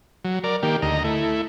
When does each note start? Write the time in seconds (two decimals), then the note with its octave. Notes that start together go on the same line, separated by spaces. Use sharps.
0.25 F#3
0.44 A#4 D5
0.63 D#3 A#3 G4
0.82 D2 D#5 A#5
1.04 A3 E4